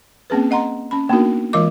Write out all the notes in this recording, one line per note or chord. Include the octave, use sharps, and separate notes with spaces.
A#3 C4 C#4 G#4 B4
D#5 F#5 A#5 C6
C#4 B5
A#3 B3 D4 D#4 F#4 A#4
E3 G#3 F4 A#4 D#5 D6